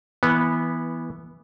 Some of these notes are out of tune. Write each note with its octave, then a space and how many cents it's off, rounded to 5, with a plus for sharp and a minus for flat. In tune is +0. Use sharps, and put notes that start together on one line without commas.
E3 +0 B3 -15